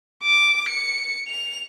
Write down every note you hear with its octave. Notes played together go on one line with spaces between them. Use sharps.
D6
C#7
F7